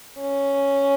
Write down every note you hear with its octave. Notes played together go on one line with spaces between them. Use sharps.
C#4